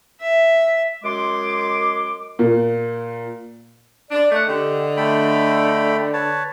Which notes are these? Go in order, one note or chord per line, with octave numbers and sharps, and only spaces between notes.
E5
F#2 G#3 C6 D6
A#2
D4 D5
A3 C#5 D#5 F#5
D3 G4
A3 G5 B5
B4 C#5 A5